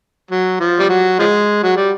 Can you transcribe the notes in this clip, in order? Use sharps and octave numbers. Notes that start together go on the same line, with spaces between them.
F#3
F3
G3
F#3
F3 G#3
F#3
G3